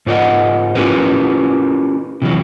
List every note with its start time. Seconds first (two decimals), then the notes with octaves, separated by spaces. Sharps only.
0.06 G#2 F4 A#4 D5 D#5 F#5
0.75 C#4 E4 F4 G4 A#4 B4
2.22 C3 E3 F#3